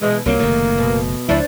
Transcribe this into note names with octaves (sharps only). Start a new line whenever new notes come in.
B2 E3 G#3
C2 F#3 G3 A#3 C4
F#1 C3 D#3 A3
B2
C#2 F3 D4 E4 C5 C#5